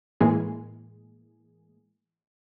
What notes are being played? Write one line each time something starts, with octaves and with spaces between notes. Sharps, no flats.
A2 E3 G#3 A#3 G#4